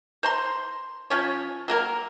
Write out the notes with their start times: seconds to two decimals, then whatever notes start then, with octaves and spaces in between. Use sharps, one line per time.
0.23 C5 A#5 C6
1.10 F3 C#4 C#5
1.68 F#3 A#3 A#4